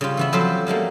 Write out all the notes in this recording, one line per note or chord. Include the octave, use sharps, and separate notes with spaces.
C#3 G3 F4
E3 B3 E4
F3 F#3 C4 A4 C5 E5
F#3 G3 A3 A#3